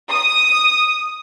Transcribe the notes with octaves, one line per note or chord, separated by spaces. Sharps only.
D#6